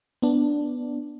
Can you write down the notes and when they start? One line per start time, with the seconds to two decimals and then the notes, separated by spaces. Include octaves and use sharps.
0.22 B3 D4